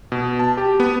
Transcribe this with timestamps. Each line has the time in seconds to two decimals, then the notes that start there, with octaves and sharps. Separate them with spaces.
0.12 B2
0.39 A5
0.57 G4
0.80 B3